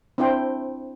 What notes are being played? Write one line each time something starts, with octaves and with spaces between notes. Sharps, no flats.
C4 D4 E4 C5 G5